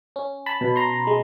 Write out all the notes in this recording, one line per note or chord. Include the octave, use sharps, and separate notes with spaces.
C#4
A5 B5
B2
A#5 C6
G#3